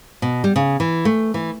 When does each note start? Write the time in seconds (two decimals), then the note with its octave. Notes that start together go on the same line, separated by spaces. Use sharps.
0.22 B2
0.44 G3
0.56 C#3
0.80 E3
1.05 A3
1.34 E3